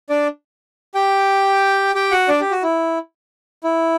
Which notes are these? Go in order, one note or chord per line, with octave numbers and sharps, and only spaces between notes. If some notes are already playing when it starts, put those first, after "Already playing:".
D4 D5
G4 G5
G4 G5
F#4 F#5
D4 D5
G4
F#4
E4
E4